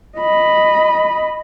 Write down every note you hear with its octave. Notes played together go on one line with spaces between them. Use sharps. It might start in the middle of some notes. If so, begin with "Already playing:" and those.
D#5 B5